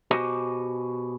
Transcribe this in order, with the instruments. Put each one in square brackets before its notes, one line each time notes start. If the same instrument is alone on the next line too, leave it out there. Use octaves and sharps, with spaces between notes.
[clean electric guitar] B2 F#4 G4 C5 D#5 G#5